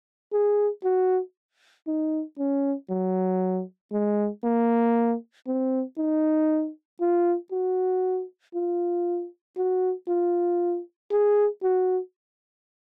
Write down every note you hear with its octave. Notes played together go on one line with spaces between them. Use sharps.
G#4
F#4
D#4
C#4
F#3
G#3
A#3
C4
D#4
F4
F#4
F4
F#4
F4
G#4
F#4